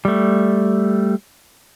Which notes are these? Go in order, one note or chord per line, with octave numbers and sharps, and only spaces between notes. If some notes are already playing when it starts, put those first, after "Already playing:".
G3 A3